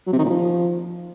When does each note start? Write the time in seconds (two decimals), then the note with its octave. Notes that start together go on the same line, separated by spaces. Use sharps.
0.06 F#3
0.12 C3
0.18 D#3
0.24 A#2
0.30 F3